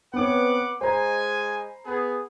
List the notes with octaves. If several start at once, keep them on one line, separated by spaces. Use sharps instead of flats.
B3 C4 B4 C#5 F#5 D6
G#3 C5 G#5 A#5 B5
B3 G#4